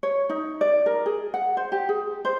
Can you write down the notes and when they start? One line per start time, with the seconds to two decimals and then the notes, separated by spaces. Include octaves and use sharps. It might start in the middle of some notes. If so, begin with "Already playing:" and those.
0.03 C#5
0.30 D#4
0.61 D5
0.86 A#4
1.06 G#4
1.34 F#5
1.57 C5
1.72 G4
1.89 G#4
2.25 C5